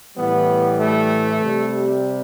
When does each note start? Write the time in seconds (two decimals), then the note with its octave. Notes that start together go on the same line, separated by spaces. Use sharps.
0.17 A2 E3 G3 B3
0.80 A3
1.41 C3 G3